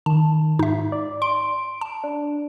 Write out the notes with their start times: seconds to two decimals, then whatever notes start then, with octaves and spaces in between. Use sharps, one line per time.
0.06 D#3 A5
0.59 G#2 D#4 E5
0.92 D5
1.22 C6 D7
1.81 A5
2.04 D4